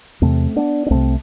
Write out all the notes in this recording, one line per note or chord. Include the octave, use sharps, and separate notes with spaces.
E2 C3 A3 C4
B3 D4
D4
C2 C3 A3 C4